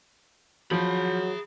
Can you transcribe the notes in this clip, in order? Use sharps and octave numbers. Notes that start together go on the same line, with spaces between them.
F3 F#3 G#4 B5